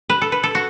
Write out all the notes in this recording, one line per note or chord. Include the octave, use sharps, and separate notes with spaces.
B4
A4
B4
A4
F#4